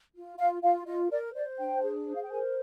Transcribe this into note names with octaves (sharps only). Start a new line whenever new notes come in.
F4
F4 F5
F4 F5
F4 D#5
A#4 D5
C5 D5
D4 G5
G#4
C5
F5
G5
A#4 G#5